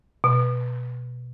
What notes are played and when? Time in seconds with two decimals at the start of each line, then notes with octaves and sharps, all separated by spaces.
0.24 B2